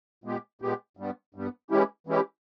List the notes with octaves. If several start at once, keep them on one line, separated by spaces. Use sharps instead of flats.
A#2 G#3 B3 G4
A#2 G#3 B3 G4
G2 G3 B3
G2 G3 B3
E3 G#3 C#4 E4 G4
E3 G#3 C#4 E4 G4